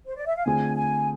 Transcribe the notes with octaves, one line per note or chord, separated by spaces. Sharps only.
C5
D5
E5
F5
D3 A3 C4 F4 G#4 G#5
G#5